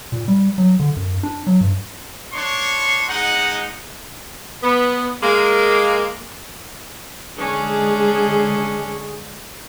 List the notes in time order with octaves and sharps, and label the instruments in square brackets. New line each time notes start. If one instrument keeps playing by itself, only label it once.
[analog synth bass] A#2
G3
F#3
D3
F#2
D4
F#3
G2
[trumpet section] D4 C#5 C6 C#6
G#3 D#4 F#5
[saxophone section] B3
G#3 A#3
[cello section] D3 G#3 G#4 [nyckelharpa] C#4 D4